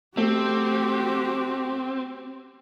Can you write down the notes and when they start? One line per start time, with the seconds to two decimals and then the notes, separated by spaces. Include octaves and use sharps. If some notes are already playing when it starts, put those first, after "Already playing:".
0.17 A3 C4 F#4 G4